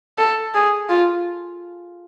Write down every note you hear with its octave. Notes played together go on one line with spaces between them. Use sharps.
A4
G#4
F4